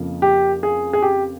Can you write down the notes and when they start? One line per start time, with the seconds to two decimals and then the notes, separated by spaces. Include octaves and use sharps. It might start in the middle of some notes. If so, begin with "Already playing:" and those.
Already playing: F2 C#3 F3 A#3
0.22 G4
0.63 G#4
0.93 G#4
1.02 G4